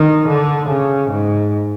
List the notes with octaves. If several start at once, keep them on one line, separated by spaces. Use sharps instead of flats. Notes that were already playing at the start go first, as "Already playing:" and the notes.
Already playing: D#3
D3
C#3
G#2